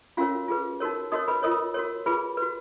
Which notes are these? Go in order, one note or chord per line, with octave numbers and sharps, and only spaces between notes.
C#4 F4 F#4 A#4 C#5 F5
F4 G#4 B4
D#4 F#4 A#4 C#5
D#4 F#4 A#4 C#5 D#5 D#6
B4 B5
F4 A#4 C#5 D#5 D#6
F#4 A#4 C#5
F4 G#4 B4 B5
F#4 B4